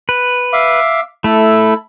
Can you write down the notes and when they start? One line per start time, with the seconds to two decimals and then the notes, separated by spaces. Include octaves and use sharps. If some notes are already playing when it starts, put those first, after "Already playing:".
0.09 B4
0.53 E5 F5 D6
1.24 A3 E4 A4 B5